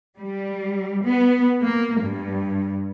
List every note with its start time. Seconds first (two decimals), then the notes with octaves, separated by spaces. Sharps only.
0.18 G3
1.04 B3
1.63 A#3
2.02 G2